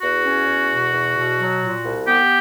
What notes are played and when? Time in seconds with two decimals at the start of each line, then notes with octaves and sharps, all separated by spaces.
0.01 E2 F#4
0.24 C#4
0.47 E2
0.70 B2
0.92 E2
1.15 B2
1.38 F#3
1.61 A#2
1.84 C2
2.06 B3 G4